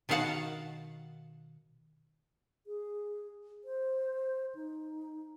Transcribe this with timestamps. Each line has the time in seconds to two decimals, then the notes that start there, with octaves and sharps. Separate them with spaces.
0.09 B2 D#3 F#4 F5 F#5 A5
2.67 G#4
3.64 C5
4.55 D#4